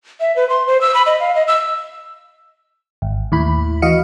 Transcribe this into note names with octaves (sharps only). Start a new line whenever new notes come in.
E5
B4
C6
C5
E6
B5
D#5
F5
D#5
E6
G#1
D#2 A2 E4 B5
E3 F#4 D#5 F5 C#7